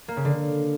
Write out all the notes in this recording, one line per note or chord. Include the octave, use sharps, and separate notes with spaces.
A#3
C#3
D3